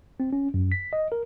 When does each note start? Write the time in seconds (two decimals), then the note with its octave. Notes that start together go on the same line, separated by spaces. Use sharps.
0.20 C4
0.33 C#4
0.54 F#2
0.72 B6
0.93 D#5
1.12 A#4